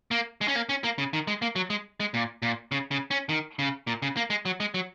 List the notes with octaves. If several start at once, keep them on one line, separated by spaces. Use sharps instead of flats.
A#3
G#3
C#4
A#3
C#4
A#3
C#3
D#3
G#3
A#3
F#3
G#3
G#3
A#2
A#2
C#3
C#3
C#4
D#3
C#3
A#2
C#3
A#3
G#3
F#3
G#3
F#3